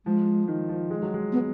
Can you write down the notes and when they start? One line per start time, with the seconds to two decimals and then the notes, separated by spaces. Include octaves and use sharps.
0.06 F3 G#3
0.48 D#3
0.69 F3
0.90 G#3
1.02 F#3
1.14 G#3
1.32 B3